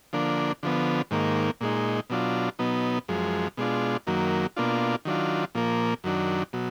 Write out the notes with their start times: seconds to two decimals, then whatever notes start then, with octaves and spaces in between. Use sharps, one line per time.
0.13 D3 F3 A#3 D4
0.63 D3 F3 B3
1.11 G#2 D#3 A#3
1.61 A#2 G#3 D#4
2.10 B2 F#3 D4 F4
2.59 B2 F#3 B3 D#4
3.08 F#2 F3 G#3
3.57 B2 G#3 D4 F4
4.07 F#2 D#3 F#3 A#3
4.57 B2 A#3 D4 F4
5.05 D#3 F#3 D4 F4
5.55 A#2 F3 A#3
6.04 F#2 D#3 F#3 D4
6.53 B2 F#3